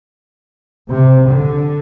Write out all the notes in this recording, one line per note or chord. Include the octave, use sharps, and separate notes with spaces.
C3
D3